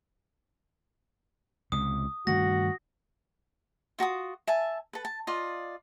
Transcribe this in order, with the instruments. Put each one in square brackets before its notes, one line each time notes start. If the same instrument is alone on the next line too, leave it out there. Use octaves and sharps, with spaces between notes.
[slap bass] C#2 C3 [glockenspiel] D#6
[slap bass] G2 D#3 A3 [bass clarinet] F#4 [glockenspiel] A#6
[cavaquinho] F4 F#4 A#5 D#6
E5 G#5 A5
A4 B4
A5
F4 D5 D#5